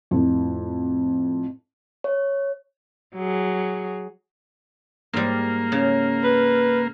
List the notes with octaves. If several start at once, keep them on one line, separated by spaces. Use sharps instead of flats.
F2 A2
C#5
F#3 G#4
G#2 G3 A#3
C#3
B4